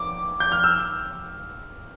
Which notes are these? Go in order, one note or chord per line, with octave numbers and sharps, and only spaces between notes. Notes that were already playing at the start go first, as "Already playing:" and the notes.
Already playing: D6
G6
F6
E6